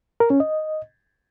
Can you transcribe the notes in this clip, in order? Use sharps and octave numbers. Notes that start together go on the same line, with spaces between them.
A#4
C#4
D#5